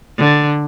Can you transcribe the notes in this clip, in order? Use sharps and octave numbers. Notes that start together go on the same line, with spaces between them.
D3